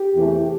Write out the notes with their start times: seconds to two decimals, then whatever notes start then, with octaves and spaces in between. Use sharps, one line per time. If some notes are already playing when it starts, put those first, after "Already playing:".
Already playing: G4
0.15 E2 C3 E3 A3